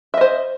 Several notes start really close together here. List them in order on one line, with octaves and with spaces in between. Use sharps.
E5 D#5 C5